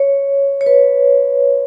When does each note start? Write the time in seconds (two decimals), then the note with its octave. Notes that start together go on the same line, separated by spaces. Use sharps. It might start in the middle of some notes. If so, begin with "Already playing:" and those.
Already playing: C#5
0.61 C#5
0.66 B4